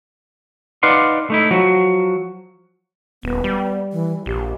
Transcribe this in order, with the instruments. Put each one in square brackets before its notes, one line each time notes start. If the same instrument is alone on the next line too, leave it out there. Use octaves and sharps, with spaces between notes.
[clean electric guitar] D#4 B4 D5 F5 F#5 C6
A3 D#4 E4
F3 F#3 F#4
[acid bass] D#1 [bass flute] B3
[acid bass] G3
[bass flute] E3
[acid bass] A#1 [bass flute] G4